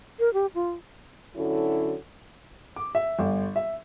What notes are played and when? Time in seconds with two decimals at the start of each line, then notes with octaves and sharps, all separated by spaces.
0.19 A#4
0.34 G4
0.55 F4
1.35 D3 F#3 C#4 E4 F#4 A4
2.76 D6
2.95 E5
3.19 G1
3.56 E5